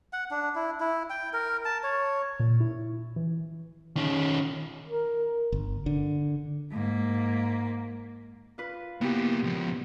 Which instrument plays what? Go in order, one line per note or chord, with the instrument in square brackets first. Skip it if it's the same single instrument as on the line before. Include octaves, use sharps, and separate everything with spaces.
[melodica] F#5
D4
E4
E4
G5
A#4
A5
C#5
[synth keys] A#2
E4
E3
[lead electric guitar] D#3 C#4
[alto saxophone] A#4
[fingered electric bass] G1
D3
[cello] G#2 A#3
[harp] F4 B4
[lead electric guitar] A#3 E4 [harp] B3 G4
[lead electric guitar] C#2 F3